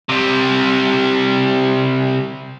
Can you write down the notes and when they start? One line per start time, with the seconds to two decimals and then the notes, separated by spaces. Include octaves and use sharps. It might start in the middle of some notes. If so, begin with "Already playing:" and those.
0.09 C3 G3